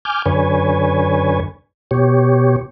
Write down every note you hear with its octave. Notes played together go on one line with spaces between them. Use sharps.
G#5 D6 F6 G6
F#2 D3 B4 C#5 G#5
B2 G4 C#5